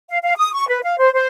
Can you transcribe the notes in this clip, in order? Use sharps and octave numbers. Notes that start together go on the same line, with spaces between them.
F5
F5
D#6
C#6
B4
F5
C5
C5